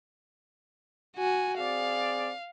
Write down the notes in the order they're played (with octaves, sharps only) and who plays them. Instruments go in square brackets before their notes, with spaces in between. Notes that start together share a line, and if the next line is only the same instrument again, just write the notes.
[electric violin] F#4 G#5
[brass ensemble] C4 G#4 D5 [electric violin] F5